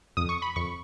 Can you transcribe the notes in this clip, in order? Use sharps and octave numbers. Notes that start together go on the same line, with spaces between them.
F2 D#6
C#6
B5
F2 C#6